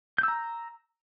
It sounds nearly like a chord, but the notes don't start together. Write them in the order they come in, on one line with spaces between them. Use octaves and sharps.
G6 E6 A#5